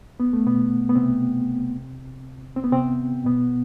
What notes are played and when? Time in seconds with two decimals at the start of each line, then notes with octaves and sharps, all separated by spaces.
0.20 B3
0.33 A3
0.46 B2 B3
0.89 B3
0.95 C3 C4
2.56 C4
2.64 B3
2.72 C3 C4
3.25 B2 B3